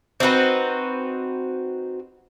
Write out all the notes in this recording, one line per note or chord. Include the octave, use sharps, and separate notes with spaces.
C4 D#4 F#4 B4